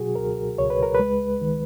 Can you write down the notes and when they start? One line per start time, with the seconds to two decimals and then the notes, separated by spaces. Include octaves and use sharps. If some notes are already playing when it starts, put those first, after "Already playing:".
Already playing: B2 F#3 F#4 G#4
0.16 C#2 A#4
0.58 C#2 C#5
0.70 B4
0.83 A#4
0.95 G#3 B4
1.41 D#3